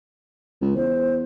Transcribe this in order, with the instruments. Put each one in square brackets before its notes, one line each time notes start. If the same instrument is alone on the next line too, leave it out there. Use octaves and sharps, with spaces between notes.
[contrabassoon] C#2
[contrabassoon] E2 [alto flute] C5